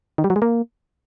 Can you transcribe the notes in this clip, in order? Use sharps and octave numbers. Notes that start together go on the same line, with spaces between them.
D#3
G3
F#3
G#3
A#3